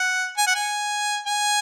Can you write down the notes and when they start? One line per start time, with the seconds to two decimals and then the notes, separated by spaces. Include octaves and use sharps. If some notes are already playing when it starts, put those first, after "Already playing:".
Already playing: F#5
0.38 G#5
0.47 F#5
0.55 G#5
1.27 G#5